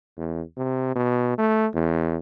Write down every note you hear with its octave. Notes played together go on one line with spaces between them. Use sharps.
E2
C3
B2
A3
E2